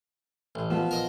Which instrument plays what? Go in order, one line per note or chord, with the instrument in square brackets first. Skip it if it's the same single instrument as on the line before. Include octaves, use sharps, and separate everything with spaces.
[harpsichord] A1
[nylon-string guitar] F3 B3
[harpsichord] A#4 D#5